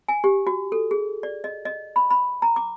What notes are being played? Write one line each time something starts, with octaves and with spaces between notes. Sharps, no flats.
G#5
G4
F#4
A4
G#4
D5
D#5
D#5
B5
B5
A#5
D6